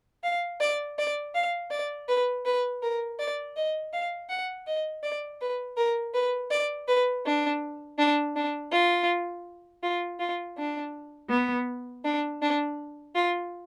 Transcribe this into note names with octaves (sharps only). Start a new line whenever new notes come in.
F5
D5
D5
F5
D5
B4
B4
A#4
D5
D#5
F5
F#5
D#5
D5
B4
A#4
B4
D5
B4
D4
D4
D4
F4
F4
F4
D4
B3
D4
D4
F4